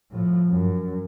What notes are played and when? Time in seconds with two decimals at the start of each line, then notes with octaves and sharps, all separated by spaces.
0.11 A2 F3
0.49 F#2